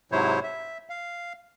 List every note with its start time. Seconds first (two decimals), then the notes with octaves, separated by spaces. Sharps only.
0.12 G#2 C3 F#3 E4 C5 C#5
0.43 E5
0.89 F5